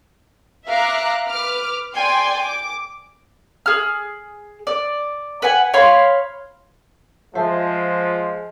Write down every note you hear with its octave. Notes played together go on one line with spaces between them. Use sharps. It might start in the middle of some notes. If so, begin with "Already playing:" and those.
E5 F5 A#5 D6 F#6
B4 D6 F6
D5 G5 G#5 C6
D6
G#4 F6
D5
B4 F#5 G#5
C#5 F5 B5 C6
F3 G#3 C5 E5 A5